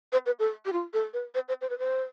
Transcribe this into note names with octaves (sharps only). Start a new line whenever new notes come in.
C5
B4
A4
G4
F4
A4
B4
C5
C5
C5
B4
C5